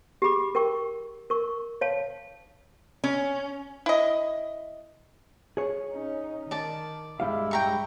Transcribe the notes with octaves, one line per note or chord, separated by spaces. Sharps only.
G4 G#4 B5 D6
A#4 G5 C#6
A#4 C#6
C#5 F5 A5
C#4
E4 D#5
G#4 C#5
C#4 D#4
D#3 D5 A5
G2 G3 G#3 E4 F5
G5 A#5 C#6